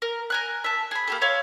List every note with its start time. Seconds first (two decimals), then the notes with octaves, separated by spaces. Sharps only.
0.02 A#4
0.30 A#4 G#5 F#6
0.64 E5 A5
0.91 G#4 B5
1.07 A#3 G4 A4
1.22 C#5 E5 F5 C6